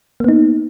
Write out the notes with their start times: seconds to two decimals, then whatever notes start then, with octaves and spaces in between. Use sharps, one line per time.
0.20 A#3
0.24 B3
0.28 D#4